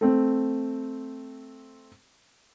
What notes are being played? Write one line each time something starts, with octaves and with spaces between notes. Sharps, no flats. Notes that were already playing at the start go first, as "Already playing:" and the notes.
A3 C4